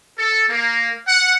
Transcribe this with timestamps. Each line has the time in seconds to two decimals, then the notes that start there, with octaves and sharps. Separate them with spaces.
0.18 A4
0.50 A#3
1.08 F#5